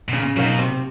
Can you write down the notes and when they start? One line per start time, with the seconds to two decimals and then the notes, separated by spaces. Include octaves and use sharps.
0.09 B2
0.13 A#2 C#3
0.37 B2 F#3 A#3 D#4
0.59 C3